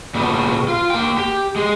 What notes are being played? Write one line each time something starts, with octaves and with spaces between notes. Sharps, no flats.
A#2 C#3 G3 A3 B3
F4
A#3 G5
G4
G#3